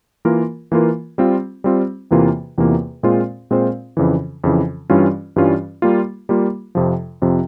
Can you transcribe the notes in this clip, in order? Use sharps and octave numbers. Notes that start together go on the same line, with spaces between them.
E3 A#3 F4 A#4
E3 A#3 F4 A#4
G3 C4 F4
G3 C4 F4
E2 C3 E3 A#3 F4
E2 C3 E3 A#3 F4
A#2 G#3 C4 F4 C5
A#2 G#3 C4 F4 C5
F2 C#3 E3
F2 C#3 E3
G2 E3 G3 C#4 F4
G2 E3 G3 C#4 F4
G3 A#3 F4
G3 A#3 F4
F2 C3 F3
F2 C3 F3